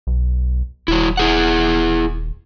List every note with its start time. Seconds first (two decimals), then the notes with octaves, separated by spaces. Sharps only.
0.07 B1
0.88 D#1 F#3 E4
1.17 E4 G#4 F#5